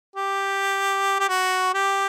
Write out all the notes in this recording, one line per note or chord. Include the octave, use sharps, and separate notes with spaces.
G4
G4
F#4
G4